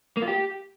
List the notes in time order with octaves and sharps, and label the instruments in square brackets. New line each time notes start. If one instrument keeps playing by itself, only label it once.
[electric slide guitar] A#3
F4
G4